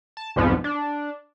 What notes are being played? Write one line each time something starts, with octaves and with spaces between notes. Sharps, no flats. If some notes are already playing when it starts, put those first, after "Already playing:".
A5
C2 F2 G#2 F3 B3
D4